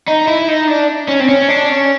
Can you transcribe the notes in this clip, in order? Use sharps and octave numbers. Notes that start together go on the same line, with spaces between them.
D#4
E4
D#4
D4
C#4
C4
C#4
D4
C#4